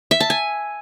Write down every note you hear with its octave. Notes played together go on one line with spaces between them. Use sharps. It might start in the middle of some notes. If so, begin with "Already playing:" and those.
E5
A5
G#5